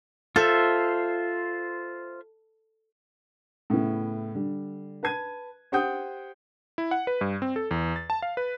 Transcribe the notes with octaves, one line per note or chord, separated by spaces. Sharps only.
F4 A4 C5 E5
A2 C#3 B3 E4
D3 G3
B4 A5 G#6 D#7
G4 C5 F#5 G5 D#6 G6
E4
F#5
B4
G2
C4
A4
E2
A6
A5
F5
B4